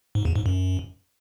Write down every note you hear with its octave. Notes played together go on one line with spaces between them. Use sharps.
G#2
E2
G#2
F#2